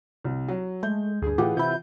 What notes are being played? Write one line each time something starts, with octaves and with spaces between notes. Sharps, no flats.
C2
F#3
G#3 A3 G6
D2 G2 G#4
A2 E3 F4 G4 F#5
C3 E4 G6